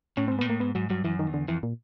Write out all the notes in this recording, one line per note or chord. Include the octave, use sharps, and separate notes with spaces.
A2 C#4
C4
G#2
A#2 B3
A2 A#3
G#2 B3
G#2 F#3
G2 F#3
F#2 E3
D#3
E2
D3
F2 E3
A#2